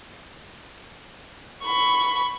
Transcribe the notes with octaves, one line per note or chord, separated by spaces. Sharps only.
B5 C#6